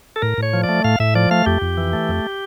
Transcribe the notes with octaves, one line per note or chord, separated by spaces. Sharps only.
A4
A2 A#4
A2 C#5
F3
D5
A3
A2 F5
A2 E5
F3 D5
A3 F5
F2 G4
F2
E3
A3
F2